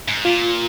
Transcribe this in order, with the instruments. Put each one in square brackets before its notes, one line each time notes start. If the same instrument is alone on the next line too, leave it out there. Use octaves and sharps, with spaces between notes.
[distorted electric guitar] G#2
[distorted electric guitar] A#2 [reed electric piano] F4